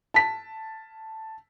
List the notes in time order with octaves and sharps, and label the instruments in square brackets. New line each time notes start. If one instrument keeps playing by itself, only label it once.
[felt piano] A5 B6